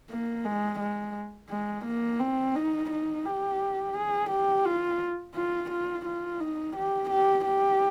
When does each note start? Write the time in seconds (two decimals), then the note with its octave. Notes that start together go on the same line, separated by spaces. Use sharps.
0.10 A#3
0.45 G#3
0.80 G#3
1.50 G#3
1.85 A#3
2.20 C4
2.55 D#4
2.90 D#4
3.26 G4
3.95 G#4
4.30 G4
4.66 F4
5.35 F4
5.71 F4
6.06 F4
6.41 D#4
6.76 G4
7.10 G4
7.45 G4